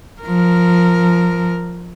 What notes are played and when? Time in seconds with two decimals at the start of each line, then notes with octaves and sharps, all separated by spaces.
0.22 F3 A#4